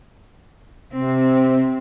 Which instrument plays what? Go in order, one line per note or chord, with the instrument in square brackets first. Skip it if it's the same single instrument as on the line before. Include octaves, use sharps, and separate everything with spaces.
[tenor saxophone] C3 [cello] C4